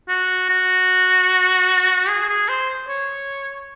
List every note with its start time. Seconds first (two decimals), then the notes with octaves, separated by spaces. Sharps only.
0.09 F#4
0.49 F#4
2.09 G#4
2.29 G#4
2.49 C5
2.88 C#5